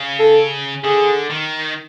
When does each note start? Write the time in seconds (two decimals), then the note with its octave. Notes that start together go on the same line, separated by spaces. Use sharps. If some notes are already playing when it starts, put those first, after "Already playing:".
Already playing: C#3
0.19 A4
0.84 D3 G#4
1.31 D#3